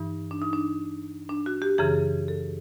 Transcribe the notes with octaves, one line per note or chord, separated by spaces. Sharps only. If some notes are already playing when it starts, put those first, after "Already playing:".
Already playing: G2 E3 D#4
D4
D#4
D4
D4
F#4
G4
F#2 C#3 E3 G#4
A4